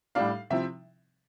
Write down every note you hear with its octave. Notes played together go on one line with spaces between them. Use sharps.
A2 G3 D4 F5
C3 F3 C4 E4 E5